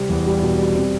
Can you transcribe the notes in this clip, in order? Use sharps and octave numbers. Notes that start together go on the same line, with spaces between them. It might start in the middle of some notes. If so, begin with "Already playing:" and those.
Already playing: C3 G3 C4
E2
G3
B2
G3
C4